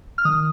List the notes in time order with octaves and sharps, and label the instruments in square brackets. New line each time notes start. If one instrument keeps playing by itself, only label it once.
[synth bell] F6
D#3 D#6